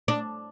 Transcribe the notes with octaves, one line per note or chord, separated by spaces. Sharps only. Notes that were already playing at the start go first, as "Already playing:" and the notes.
D4